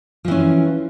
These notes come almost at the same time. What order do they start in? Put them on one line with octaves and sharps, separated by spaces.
F3 E3 C#4